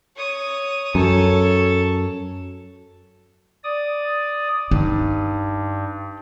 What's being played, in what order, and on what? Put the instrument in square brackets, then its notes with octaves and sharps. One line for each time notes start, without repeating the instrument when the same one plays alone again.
[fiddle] C#5 D#6
[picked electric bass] F#2 [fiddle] A4 C#5
[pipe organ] D5 D#6
[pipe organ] G2 [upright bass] D#4